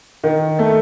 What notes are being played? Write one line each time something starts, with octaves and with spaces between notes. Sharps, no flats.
D#3
A3